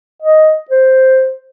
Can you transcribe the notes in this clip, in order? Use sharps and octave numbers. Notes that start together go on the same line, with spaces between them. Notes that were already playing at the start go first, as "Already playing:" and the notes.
D#5
C5